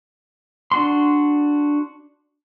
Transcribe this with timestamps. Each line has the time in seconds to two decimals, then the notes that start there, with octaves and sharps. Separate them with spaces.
0.72 D4 F#4 C6